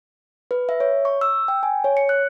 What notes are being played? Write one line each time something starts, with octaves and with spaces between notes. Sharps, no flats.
B4
E5
C#5
C#6
E6
G5
G#5
C#5
C#7
F#6